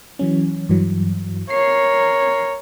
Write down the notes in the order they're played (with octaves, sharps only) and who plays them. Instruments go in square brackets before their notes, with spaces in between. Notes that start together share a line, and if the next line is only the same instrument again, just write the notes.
[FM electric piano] E3 F#3 C#4
G2 E3 F#3
[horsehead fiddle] A#4 C#5 [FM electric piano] C7